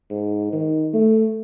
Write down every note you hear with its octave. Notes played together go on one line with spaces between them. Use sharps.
G#2
D#3
A3